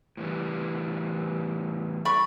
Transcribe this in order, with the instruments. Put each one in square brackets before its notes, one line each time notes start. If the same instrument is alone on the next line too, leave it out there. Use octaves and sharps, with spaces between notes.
[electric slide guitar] A2 E3 G3
[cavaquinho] D5 B5 C#6